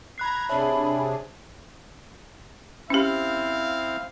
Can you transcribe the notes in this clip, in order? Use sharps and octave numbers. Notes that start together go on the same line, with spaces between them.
A#5 B5 F#6 G#6 C7
C3 D4 G#4 C#5 E5 A5 B5
C4 C#4 E4 G4 C5 F5